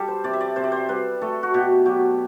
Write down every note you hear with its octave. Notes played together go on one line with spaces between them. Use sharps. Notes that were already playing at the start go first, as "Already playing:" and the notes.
Already playing: G3 G4 A4
C5
C3 D5
E5
D5
C3 C5
D5
C5
G3 B4
A3 A4
F#4
B2 G4
F#3 G4